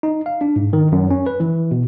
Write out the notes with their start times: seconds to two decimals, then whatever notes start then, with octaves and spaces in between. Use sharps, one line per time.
0.03 D#4
0.26 F5
0.41 D4
0.56 G#2
0.73 D#3
0.92 F#2
1.11 C#4
1.26 B4
1.40 E3
1.71 B2